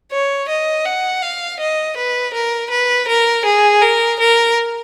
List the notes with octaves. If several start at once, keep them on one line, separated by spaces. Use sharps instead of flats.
C#5
D#5
F#5
F5
D#5
B4
A#4
B4
A#4
G#4
A#4
A#4